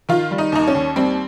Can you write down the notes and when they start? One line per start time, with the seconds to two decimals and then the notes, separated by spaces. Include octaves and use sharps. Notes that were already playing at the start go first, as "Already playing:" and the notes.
0.09 D#3 F4
0.31 G3
0.38 D#4
0.52 D#2 D#4
0.68 C#4
0.75 D#2
0.96 G3 C4